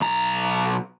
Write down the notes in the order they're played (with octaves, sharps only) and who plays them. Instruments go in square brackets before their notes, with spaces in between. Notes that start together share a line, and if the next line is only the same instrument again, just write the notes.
[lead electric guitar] B1 A#5